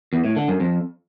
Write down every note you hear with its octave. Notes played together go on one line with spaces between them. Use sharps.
E2
A2
D3
F#2
F2